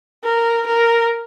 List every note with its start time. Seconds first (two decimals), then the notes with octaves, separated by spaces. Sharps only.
0.24 A#4
0.66 A#4